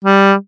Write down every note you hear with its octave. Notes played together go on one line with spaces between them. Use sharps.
G3